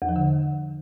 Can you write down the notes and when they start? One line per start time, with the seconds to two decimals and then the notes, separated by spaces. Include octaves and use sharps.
0.02 E2
0.09 F3
0.16 D3